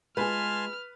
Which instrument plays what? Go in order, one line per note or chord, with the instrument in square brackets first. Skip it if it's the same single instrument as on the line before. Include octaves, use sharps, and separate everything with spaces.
[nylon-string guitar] G#3 F4 G#4 [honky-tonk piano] B4 [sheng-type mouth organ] G#5 A5 C6 [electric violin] F6